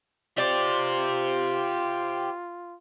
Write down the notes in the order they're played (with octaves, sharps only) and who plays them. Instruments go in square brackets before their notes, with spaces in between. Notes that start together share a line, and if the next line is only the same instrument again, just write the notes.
[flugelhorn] F4 [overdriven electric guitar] G4 C5 [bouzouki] D5